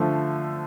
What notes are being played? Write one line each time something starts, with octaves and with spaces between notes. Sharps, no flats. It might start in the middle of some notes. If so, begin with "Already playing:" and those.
Already playing: D3 F3 A3